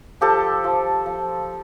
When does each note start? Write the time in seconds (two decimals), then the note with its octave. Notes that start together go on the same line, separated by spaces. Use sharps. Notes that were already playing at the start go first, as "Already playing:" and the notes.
0.21 F3 G4 A4
0.64 F3
1.06 F3